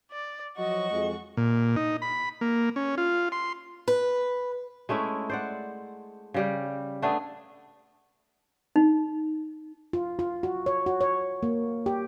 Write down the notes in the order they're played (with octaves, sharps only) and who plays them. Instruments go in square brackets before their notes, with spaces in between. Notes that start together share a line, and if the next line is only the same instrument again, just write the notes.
[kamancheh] D5
[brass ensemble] F3 F#3 [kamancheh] F#4 C#6 [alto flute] D#5
[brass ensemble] F2 G#3
[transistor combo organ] A#2
D#4
B5
A#3
C#4
F4
C6
[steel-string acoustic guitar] B4
[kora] G#3 A3 C#4 E4
C5 D5 F#5
C#3 G3 G4
A3 B3 D4 G#4
[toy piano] D#4
[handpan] F4
F4
F#4
C#5
F#4
C#5
A#3
G4